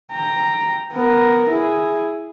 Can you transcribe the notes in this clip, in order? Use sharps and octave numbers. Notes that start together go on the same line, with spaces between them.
G5 A#5
B3 A#4
E4 G#4